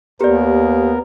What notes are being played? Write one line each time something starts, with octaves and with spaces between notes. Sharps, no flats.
D#2 B3 G4 A#4 D5